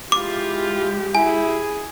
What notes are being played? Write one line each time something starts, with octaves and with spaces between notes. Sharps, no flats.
G#3 E4 F4 G4 D6
E4 G#4 G#5